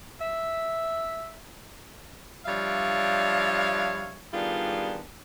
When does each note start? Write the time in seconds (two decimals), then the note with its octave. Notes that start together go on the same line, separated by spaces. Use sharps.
0.20 E5
2.46 F3 G3 D4 C#5 E5 F5
4.33 D#3 G3 B3 D4 F4 G#4